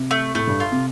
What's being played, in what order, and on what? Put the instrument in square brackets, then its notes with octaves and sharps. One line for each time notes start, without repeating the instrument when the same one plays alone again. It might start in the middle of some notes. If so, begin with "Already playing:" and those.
Already playing: [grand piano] C3
[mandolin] A3
[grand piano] A2 [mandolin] A3
[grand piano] G2
[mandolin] F4
[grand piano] C3